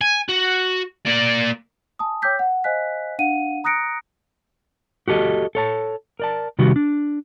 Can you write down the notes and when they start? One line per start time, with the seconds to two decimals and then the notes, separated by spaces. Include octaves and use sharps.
0.01 G#5
0.29 F#4
1.06 A#3 D5
1.99 G#5 A5 D#6
2.22 C#5 G5 D6 E6 G6 B6
2.39 F#5
2.64 C5 D#5 F5 G#5 F#6 B6
3.19 D4 F5 F#5 D#7
3.64 A#5 D#6 F#6 A#6 C#7 D7
5.08 F#4 G4 A4 D#5
5.55 A4 C#5 A5
6.20 A#4 D5 A5
6.59 C3 D#3 G3 F#4
6.76 D4